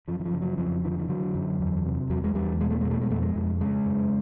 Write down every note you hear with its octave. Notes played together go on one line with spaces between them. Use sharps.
F#2 F3
E3
F3
C#3
F#3
F2 F3
D3 E3
F3
E3
D3 F#3
F#2
E2
C3
E2 F#3
G#3
E2 G3
B2 G#3
A3
B2 G#3
A3
G#3
F2 A3
G#3
F2
C#3 G#3
F#2